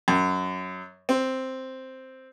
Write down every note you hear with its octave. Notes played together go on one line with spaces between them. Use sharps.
F#2
C4